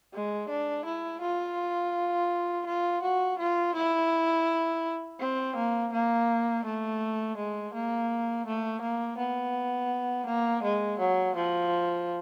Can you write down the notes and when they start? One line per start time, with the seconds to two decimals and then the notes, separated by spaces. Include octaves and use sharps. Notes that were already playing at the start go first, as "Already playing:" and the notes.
0.13 G#3
0.49 D4
0.85 E4
1.21 F4
2.66 F4
3.02 F#4
3.38 F4
3.75 E4
5.19 C4
5.56 A#3
5.93 A#3
6.65 A3
7.36 G#3
7.74 A#3
8.46 A3
8.81 A#3
9.18 B3
10.26 A#3
10.63 G#3
10.99 F#3
11.35 F3